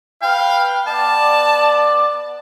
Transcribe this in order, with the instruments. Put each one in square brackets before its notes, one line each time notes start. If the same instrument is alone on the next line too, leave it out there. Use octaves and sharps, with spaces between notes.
[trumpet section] B4 G5 [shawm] F5
[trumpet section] B3 D5 [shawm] A5